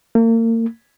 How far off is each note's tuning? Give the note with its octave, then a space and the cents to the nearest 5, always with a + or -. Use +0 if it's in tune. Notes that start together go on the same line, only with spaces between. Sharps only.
A#3 -40